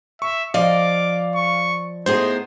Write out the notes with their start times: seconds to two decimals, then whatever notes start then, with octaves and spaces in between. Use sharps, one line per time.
0.22 E5 C#6
0.54 F3 D5 D#5 F5 D6
1.36 C#6
2.06 A2 B3 D#4 G#4 C5